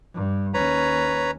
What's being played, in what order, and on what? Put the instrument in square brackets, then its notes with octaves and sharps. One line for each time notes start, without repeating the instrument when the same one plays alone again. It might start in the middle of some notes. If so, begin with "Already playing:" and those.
[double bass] G2
[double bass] D#2 C#4 [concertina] B4 C#5 A#5